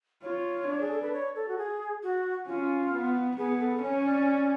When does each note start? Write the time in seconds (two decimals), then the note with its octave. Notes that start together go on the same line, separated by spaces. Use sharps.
0.23 F4 C#5
0.68 D4
0.81 G#4
0.92 A4
1.02 B4
1.13 C#5
1.35 A4
1.48 F#4
1.58 G#4
2.03 F#4
2.47 C#4 F4
2.93 B3
3.37 B3 G#4
3.60 A4
3.82 C#4 C#5
4.05 D5